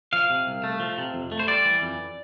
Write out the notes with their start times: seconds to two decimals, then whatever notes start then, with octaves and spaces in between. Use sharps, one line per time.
0.13 F3 F5
0.30 C3
0.47 C2
0.64 A3
0.80 F3
0.98 C3
1.14 F2
1.32 A3
1.39 C5
1.48 G3 D5
1.65 E3
1.82 F2